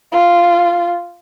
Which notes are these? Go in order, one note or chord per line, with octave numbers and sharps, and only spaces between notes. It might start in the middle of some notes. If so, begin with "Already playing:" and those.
F4